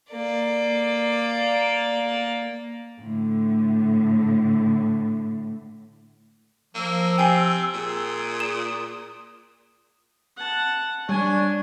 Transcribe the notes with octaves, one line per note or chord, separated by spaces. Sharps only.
A#3 D5
A2 D3
F3 A#3 E6
C3 G5 G#5 C7
A#2 G#4
D#6 E7
F#5 A5
G3 D4 C#5 G#5